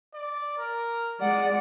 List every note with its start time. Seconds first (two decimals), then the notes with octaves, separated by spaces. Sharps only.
0.14 D5
0.58 A#4
1.21 G#3 D5 F#5